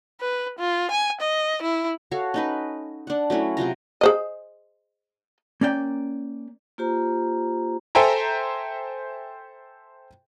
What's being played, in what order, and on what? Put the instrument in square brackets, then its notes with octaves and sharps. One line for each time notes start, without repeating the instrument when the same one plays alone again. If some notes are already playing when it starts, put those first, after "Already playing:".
[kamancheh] B4
F4
G#5
D#5
E4
[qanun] F#4 A4 C#5 F5
C#4 D#4 B4
D4 F#5
F#3 A3 C#4 E4
C3 F#3 F4 A#5
[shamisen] G#4 C5 D#5
[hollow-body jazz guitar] A#3 C#4 D5 G5
[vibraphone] A#3 F4 G4 C5 A#5
[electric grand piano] A4 C5 E5 G5 G#5 A#5